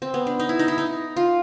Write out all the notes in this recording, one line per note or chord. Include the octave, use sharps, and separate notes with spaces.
C4
B3
D4
D#4
E4
D#4
E4
D#4
F4